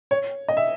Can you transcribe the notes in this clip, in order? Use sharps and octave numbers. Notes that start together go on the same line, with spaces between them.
C#5
D#5
E5